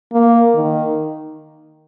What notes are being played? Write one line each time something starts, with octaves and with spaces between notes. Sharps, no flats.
A#3
D#3